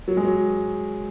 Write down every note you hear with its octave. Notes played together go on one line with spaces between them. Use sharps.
F#3
G#3
F#3